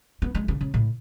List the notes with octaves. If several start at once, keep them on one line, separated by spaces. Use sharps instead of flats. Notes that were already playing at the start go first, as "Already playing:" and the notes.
B3
G#3
C#3
C#3
A2